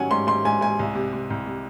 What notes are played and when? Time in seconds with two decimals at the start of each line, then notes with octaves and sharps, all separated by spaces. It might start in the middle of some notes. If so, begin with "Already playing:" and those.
Already playing: D#3 F#3 C#4 F#5 G#5
0.11 G#2 C6
0.27 G#2 C6
0.45 G#2 G#5
0.61 G#2 G#5
0.79 C2
0.95 C3
1.13 C3
1.30 C2
1.46 C3